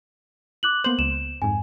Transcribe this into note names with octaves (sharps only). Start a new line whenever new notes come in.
D6 F#6 F#7
A#3 B3 C5 F#7
C#2 E7
F2 G#2 G#5